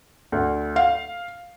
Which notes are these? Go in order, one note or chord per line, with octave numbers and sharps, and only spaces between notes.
D2
F5